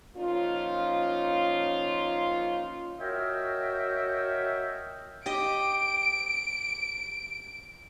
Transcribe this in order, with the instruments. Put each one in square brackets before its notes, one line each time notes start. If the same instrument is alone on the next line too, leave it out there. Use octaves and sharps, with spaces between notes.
[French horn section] F3 A#3 C#4 D#4 F4
[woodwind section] F#4 A#4 C#5 D#5 E5 G5
[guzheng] G4 D#5 [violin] D7